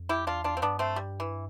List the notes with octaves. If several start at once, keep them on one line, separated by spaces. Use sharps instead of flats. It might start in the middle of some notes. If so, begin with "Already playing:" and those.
Already playing: F2
E4 G4
E2 D4 F4
D4 F4
C4
G2 B3 D4
A3 C4
G3
E3